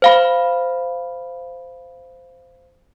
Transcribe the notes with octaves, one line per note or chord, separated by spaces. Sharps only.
C5 F5 B5